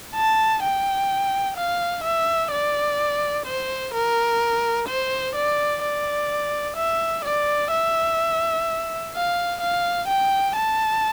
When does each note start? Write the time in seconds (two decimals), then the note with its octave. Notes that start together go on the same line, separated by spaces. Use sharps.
0.16 A5
0.63 G5
1.57 F5
2.04 E5
2.51 D5
3.46 C5
3.94 A#4
4.89 C5
5.35 D5
5.82 D5
6.77 E5
7.25 D5
7.72 E5
9.15 F5
9.61 F5
10.09 G5
10.56 A5